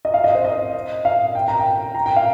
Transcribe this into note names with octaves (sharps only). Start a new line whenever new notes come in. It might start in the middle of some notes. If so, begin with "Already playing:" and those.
D#5
F5
D#5
C5
D#5
F5
G5
A#5
G5
A#5
G5
F5